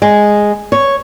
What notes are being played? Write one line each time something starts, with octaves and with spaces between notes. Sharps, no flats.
G#3
C#5